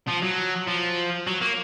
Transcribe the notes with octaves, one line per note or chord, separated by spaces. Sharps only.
F3
F#3
F3
F#3
A#3